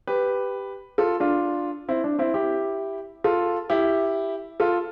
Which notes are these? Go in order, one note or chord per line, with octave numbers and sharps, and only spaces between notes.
G4 B4
F4 A4
D4 F4
C4 E4
D4
C4 E4
E4 G4
F4 A4
E4 G4
F4 A4